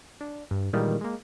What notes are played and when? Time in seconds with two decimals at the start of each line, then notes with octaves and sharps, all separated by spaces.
0.21 D4
0.51 G2
0.73 A#2 D#3 E3 G3 G#3 A#3
1.01 G#3 A#3